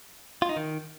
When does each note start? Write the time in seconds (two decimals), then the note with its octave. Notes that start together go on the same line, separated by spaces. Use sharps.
0.42 F4
0.49 D#4
0.56 D#3